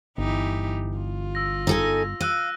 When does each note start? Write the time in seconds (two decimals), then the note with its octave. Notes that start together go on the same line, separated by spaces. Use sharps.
0.18 G1 E3 D#4 G4
0.98 F4
1.35 E6 A#6
1.67 D#4 A4 G#5
2.21 F5 E6 F#6 D#7